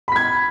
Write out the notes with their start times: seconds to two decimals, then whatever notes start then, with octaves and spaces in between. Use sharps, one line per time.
0.08 B5
0.12 B6
0.16 G#6